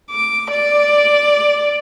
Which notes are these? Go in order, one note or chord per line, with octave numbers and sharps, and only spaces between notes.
D6
D5